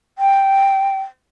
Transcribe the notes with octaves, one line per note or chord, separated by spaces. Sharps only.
G5